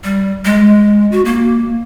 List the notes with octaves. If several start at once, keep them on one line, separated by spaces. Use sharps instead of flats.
G3
G#3
F#4
A#3